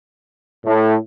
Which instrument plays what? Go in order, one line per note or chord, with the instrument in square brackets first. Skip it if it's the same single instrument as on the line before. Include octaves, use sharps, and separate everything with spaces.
[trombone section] A2